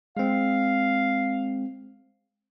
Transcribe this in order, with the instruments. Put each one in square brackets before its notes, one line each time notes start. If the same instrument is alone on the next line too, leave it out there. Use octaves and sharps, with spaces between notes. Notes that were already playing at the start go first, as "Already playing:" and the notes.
[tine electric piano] G#3 C4 [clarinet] F5